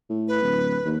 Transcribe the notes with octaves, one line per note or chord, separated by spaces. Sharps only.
A2
B4
D1
D#2